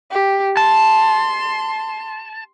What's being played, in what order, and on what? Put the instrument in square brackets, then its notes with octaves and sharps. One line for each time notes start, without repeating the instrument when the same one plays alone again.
[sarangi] G4
[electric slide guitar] A5 [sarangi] C6